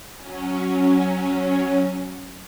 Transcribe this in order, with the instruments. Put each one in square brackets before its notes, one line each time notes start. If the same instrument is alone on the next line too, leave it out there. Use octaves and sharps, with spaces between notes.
[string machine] F#3 C#4